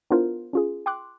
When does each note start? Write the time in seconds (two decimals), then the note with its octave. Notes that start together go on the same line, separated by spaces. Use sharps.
0.10 B3 D4 E4 F4 A#4 C5
0.53 C#4 F4 G#4
0.86 G5 C6 D6 F#6